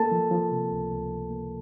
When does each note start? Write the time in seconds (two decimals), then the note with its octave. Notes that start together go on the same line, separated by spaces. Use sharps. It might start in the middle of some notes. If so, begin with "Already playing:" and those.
Already playing: A#3 A4 A5
0.12 F3
0.31 F3
0.52 C3
0.71 C#2
0.91 C#2
1.11 F3
1.31 A#3